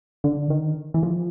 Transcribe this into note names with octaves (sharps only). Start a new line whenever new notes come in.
D3
D#3
E3
F3